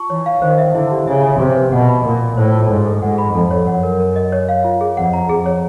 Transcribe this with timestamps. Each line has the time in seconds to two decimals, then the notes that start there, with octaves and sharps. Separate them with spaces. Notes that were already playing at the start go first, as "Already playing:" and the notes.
Already playing: F4 A5 C#6
0.10 E3 C#5
0.26 F5
0.42 D#3 C5
0.58 E5
0.75 D3 E4
0.91 G4
1.07 C#3 E5
1.23 G#5
1.39 C3 G4
1.56 B4
1.72 B2 F#5
1.89 B5
2.04 A#2 A#4
2.20 D5
2.37 A2 C5
2.53 F4
2.70 G#2 F4
2.86 A4
3.02 G#2 F#5
3.18 B5
3.34 F2 A4
3.51 C#5
3.67 F#2 F#5
3.83 A#4
4.00 A#4
4.16 D#5
4.32 C#5
4.49 F5
4.64 F4
4.81 G#4
4.97 F2 F#5
5.13 A#5
5.30 F2 G#4
5.46 C#5